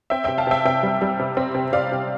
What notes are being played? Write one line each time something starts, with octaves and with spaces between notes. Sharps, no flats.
C4 E5 G5
C3 E5 G5
F5 A5
C3 E5 G5
C3 E5 G5
G3
G3
C3
C4
C3
C3 D5 F5
C3